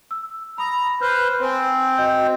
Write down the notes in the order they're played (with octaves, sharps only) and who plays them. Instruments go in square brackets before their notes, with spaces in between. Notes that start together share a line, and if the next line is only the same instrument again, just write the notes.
[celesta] E6
[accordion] A#5 [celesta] B5 D#6
[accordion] B4 C5 [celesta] F6 G6
[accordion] C4 [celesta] C5 G#5
[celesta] F#4 D#5 G6